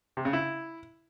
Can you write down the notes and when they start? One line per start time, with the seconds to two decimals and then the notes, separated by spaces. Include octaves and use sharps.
0.17 C3
0.25 C#3
0.33 E4